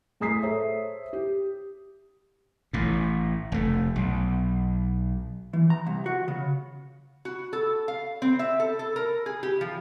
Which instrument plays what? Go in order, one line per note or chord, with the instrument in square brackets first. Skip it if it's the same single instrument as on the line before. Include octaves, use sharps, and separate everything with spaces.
[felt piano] A2 G#4 A#5 D#6 B6 C7
A4 C5 C#5 E5
G4
[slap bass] A1 A2
F1 A3
B1
[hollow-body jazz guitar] E3
A#5
C2
F#4
C#3
[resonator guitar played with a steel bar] F#4
A4
F5
C4
E5
A4
A4
A#4
G#4
G4
F3